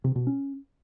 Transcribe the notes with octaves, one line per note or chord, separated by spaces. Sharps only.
C3
B2
C#4